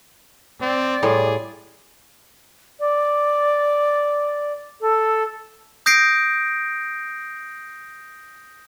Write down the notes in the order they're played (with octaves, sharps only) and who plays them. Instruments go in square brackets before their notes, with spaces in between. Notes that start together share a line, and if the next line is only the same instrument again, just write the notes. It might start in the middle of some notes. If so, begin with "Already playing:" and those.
[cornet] C4 [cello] D5
[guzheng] A2 G3 [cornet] G#4 [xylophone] C#5 C6
[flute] D5
A4
[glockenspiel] D#6 G6 A#6 C7 D7